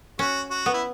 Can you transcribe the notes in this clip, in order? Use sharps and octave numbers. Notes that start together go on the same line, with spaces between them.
C#4 F#4
F#4
B3
E4